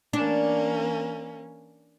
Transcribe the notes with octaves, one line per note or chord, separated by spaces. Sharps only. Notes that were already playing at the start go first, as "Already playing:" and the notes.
E3 A#3 C#4 D4